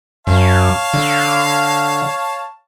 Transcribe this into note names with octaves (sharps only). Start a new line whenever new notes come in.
F#2 C#5 F5 A5
D3